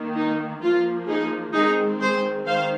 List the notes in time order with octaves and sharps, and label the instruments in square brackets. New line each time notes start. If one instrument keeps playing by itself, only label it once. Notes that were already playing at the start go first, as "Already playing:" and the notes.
Already playing: [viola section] D#3 A#3
D#4
F3 A#3 F4
D#4 G#4
D#3 G#3 C4 D#4 G#4
G#4 C5
D#3 C5 F5